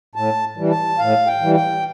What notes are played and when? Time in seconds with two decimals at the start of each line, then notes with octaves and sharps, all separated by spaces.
0.15 A2 A5
0.57 E3 G3
0.71 A5
0.99 A2 F5
1.27 G5
1.41 E3 G3
1.55 G5